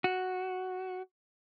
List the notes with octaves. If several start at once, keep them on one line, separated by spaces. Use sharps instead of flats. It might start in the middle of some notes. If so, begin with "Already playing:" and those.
F#4